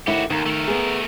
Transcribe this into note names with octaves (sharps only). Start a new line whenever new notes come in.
D#2 A3 E4 F#4 G4
D#2 D#3
A3 A#4
B3 G#4